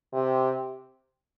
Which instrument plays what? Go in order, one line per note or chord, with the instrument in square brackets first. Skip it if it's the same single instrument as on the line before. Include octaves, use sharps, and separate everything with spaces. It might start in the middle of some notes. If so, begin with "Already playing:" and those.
[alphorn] C3